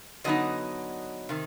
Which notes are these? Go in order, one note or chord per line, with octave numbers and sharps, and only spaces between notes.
D3 F#3 B3 D#4 D#5
C3 D#3